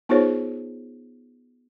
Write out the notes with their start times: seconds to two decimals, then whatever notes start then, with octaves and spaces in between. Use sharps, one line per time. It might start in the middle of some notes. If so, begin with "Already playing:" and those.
0.09 B3 D#4 F4 G#4 C5 C#5